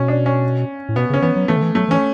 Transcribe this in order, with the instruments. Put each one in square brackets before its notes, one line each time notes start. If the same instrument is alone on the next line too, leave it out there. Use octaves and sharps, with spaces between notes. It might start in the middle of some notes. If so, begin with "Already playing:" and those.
Already playing: [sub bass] B2 [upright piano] C#4
[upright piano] D4
C#4
[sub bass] A2
[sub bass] B2 [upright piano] B3
[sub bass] C#3 [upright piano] C#4
[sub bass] E3 [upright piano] B3
[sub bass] F#3
[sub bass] E3 [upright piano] A3
[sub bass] D3
E3
[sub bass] F#3 [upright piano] A3
[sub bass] E3 [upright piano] C#4